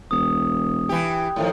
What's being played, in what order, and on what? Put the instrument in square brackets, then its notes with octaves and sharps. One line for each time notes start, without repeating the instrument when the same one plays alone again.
[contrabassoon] E1 [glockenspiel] D#6
[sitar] E3 G4
A2 D#3 F3